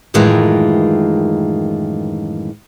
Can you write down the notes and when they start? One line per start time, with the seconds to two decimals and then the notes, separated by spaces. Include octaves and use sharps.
0.14 F#2 A2 D#3 E3 G#3 F4